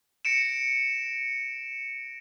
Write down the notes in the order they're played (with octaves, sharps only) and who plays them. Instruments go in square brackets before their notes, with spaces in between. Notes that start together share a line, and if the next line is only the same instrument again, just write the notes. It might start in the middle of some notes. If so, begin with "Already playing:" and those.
[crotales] A#6 C#7 D7 E7